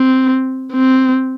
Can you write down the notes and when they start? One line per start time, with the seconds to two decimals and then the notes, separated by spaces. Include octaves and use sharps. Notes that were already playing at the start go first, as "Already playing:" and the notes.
Already playing: C4
0.73 C4